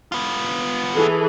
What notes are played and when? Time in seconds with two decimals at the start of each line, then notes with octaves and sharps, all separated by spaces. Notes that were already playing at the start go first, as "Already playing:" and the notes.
0.12 B3 F4
0.93 E3 G#4 A4